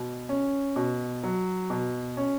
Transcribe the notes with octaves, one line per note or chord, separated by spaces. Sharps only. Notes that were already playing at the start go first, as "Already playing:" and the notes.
Already playing: B2
C#4
B2
F#3
B2
C#4